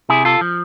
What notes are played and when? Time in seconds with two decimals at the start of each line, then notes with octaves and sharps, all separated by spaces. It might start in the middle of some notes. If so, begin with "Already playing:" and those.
0.09 C3 E4 G#4
0.25 F4 A4
0.41 F3